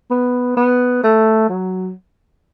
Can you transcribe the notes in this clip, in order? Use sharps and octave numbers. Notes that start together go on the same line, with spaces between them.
B3
B3
A3
F#3